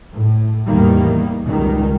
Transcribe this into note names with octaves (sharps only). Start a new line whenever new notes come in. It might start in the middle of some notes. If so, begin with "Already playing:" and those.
A2
E2 A2 D#3 G3 A#3
C#2 D#3 G3